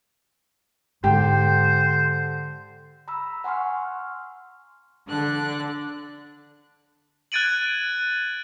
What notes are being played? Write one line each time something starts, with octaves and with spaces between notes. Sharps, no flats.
G#2 D3 G4 C5
A#5 B5 E6
F#5 G#5 C6 C#6 F6
D3 D4 D5 F#6
F#6 G#6 A6 D7 D#7 F#7